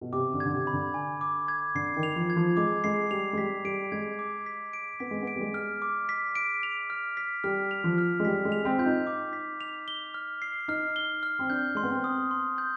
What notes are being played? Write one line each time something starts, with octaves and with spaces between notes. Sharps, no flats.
B2
C3 D6
D3
G#6
D3
C3
B5
D3
G#5
D6
G#6
D3 C7
D#3
F7
F3
G#6
F3
G#3 D6
G#3 C7
G3 F7
G#3
G3 B6
G3 D7
G#3 G#6
D6
B6
D7
B3 B6
G#3
B3 D7
G3
G#3
F6
D6
B6
D7
F7
F6
B6
G3 F6
F7
F3
F6
G#3
G3 B6
G#3
F7
C4
F4 G6
D#4
D6
B6
F7
G7
F6
C7
D#4 F6
G7
F6
C4
D4 G6
G#3 C6
B3
C4
D#6
C6
G6